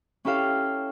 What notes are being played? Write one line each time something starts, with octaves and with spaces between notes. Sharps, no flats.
C#4 E4 G4 A4 F5